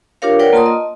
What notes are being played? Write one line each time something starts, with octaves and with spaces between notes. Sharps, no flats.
D4 F4 G4 A#4 C#5 F5
A#4 B4 C#5 D5 F#5 G5
A#3 F4 A5 C6 D#6
D#5